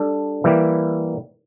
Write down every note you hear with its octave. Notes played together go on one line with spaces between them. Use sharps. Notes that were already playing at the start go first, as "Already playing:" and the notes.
Already playing: G3 D4 A4
E3 G3 A#3 E4 G4